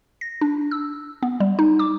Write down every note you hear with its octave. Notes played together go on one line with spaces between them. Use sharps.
A#6
D4
E6
B3
G3
D#4
D6